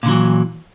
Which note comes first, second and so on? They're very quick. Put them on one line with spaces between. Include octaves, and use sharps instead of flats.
A#2 D3 F#3 E3